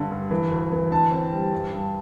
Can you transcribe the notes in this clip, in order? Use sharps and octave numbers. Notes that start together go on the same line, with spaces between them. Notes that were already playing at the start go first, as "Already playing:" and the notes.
Already playing: G2 D3
G2
E3
D2
E3
D3 A5
C4
G3
G2
G2